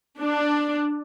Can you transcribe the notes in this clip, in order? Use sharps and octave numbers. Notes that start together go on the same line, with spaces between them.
D4